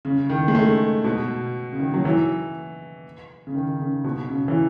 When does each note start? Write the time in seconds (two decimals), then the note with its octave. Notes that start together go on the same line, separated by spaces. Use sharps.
0.05 C#3
0.30 D#3
0.48 G#3
0.55 A3
1.04 B2
1.72 C#3
1.80 D#3
1.94 F#3
2.05 E3
3.47 C#3
3.55 D#3
3.80 C#3
4.04 B2
4.29 C#3
4.48 E3